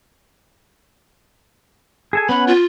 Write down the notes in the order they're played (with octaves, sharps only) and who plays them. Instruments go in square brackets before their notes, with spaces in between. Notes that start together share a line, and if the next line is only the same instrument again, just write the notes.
[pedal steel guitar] G#4 A4 G#5
[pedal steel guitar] B3 C#4 F#5 [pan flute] B5
[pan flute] F4